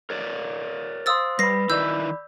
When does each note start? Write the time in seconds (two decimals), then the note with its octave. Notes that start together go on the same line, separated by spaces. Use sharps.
0.10 A#4 C#5 D5
1.06 C5 F5 C6 D#6 E6 A6
1.39 G3 B4 B5 A#6 C7
1.70 D#3 E3 E4 D5 B5 E6 G6